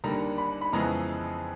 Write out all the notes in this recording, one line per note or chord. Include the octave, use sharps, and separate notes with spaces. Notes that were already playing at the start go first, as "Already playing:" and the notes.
D#2 D3 G3 A#3 A#5
B5
B5
F2 C#3 E3 G#3 B3 A#5